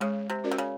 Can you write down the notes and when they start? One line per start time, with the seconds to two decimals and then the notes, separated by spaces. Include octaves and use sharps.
0.01 C#3 G#3
0.30 C3
0.44 C#4 F#4 A#4 D5
0.51 C3
0.58 C#3